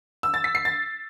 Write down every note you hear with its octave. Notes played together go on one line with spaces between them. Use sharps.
E6
A6
B6
C7
A6